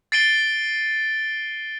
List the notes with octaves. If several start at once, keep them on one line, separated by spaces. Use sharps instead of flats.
A6 C7 D7 D#7 G7